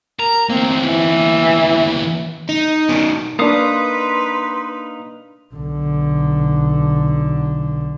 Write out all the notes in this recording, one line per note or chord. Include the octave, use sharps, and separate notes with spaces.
A#4 A#5
E2 A#3 C4
E3
D#4
B2 D#3
A#3 D4 D#4 B4 F5 C6 D#6
B1 D3